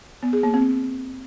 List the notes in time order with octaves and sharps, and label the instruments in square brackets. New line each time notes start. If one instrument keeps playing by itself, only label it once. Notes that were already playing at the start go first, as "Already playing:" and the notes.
[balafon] B3
G#4
A#3
C4